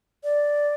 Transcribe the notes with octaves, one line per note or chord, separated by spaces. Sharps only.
D5